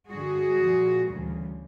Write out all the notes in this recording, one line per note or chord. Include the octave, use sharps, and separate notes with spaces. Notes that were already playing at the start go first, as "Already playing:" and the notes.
G2 D3 G3 F#4 G#4
A#2 F3
D2 C#3 E3 G3